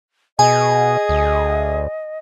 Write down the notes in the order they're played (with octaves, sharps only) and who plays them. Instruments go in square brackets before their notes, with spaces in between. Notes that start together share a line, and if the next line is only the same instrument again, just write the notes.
[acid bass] B2 [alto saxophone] G#4 [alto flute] D#5 [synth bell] G#5
[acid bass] D2